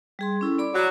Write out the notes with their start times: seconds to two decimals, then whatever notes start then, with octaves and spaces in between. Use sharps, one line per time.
0.19 G3 G#4 C6
0.41 C#4 E4 A4
0.58 D5 B5 D6
0.75 F#3